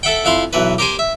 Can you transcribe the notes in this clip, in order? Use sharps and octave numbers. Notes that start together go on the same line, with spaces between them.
A4 E5 F#5 G5
F2 E4 F5 C6
B1 E3 B4
G4 A#4 C5 G#5
E5